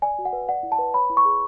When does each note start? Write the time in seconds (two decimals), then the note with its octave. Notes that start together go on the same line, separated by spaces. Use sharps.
0.02 D5 G#5
0.18 F#4
0.25 F#5
0.33 B4
0.49 D5 F#5
0.63 E4
0.72 A5
0.78 B4
0.94 C#5 B5
1.10 E4
1.17 C#6
1.25 G#4